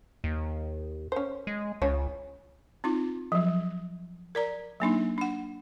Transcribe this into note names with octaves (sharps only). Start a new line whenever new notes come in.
D#2
C#4 C5
G#3
C#2 C#4 C#5
C4 D#4 F4
F3 F#3
A#4 D5 A#5
F#3 A#3 D4 D#4
D4 F#5